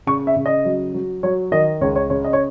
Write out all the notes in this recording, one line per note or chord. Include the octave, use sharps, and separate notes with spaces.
C#3 C#6
E5
C#3
D#5
F#3
F#3
F#3 C#5
D#3 D#5
C#2 C#5
C#5
C#3 C#5
D#5
C#5